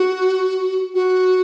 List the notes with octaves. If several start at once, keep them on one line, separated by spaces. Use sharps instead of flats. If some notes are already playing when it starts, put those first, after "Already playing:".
Already playing: F#4
F#4